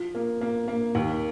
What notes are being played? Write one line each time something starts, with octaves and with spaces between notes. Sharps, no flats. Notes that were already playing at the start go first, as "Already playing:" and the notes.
Already playing: F3
A#3
A#3
A#3
D#2